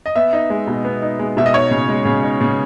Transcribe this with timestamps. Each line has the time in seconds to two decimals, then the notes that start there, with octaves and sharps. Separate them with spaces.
0.06 D#5
0.16 B3 E5
0.33 D#4
0.50 G#3
0.67 B2
0.85 B3
1.02 D#4
1.19 G#3
1.37 B2 E5
1.46 D#5
1.54 D#4 C#5
1.71 C#3
1.89 G#3
2.05 C#3
2.23 D#4
2.41 C#3